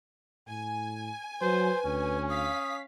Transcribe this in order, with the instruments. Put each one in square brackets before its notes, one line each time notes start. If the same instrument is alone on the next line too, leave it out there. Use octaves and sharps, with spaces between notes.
[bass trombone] A2 [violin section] G#5
[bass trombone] F#3 [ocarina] B4 [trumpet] C5
[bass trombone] D2 [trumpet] C#4
[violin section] F5 B6 [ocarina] D#6